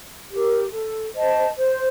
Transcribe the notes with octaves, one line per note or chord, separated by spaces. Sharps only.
G4 A#4
A4
C5 D#5 A5
C5